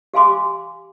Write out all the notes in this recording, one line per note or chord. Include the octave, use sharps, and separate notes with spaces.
G4 F5 G#5 C6 D6